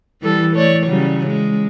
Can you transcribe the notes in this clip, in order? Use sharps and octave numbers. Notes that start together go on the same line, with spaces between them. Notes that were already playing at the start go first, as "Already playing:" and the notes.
E3 G3 A4
A3 C#5 D5
C#3 F#3 G3
G#3